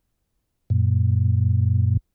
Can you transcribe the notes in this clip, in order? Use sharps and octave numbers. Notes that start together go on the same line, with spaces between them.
F#2 A#2